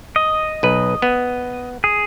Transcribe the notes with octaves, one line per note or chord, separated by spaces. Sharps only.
D#5
B1 B4
B3
G#4